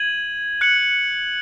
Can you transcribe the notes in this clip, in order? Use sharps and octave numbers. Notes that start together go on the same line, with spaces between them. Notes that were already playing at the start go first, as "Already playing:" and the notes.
Already playing: G#6 D#7 F#7
F#6 C#7 F#7